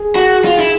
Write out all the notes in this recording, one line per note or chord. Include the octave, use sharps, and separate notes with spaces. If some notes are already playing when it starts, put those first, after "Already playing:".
Already playing: G#4
F#4
F4
E4